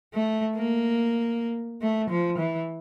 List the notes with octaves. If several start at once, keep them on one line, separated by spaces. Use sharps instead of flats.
A3
A#3
A3
F3
E3